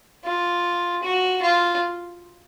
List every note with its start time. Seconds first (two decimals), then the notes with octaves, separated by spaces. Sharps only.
0.25 F4
1.03 F#4
1.42 F4